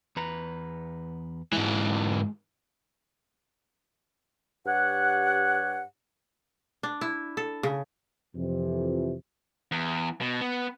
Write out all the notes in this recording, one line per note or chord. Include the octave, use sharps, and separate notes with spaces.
E2 B4 A#5
G#2 E3 G#3
G2 G4 C#5 F#5
D4
E4
A4
C#3
F2 C3 E3
E2
B2
B3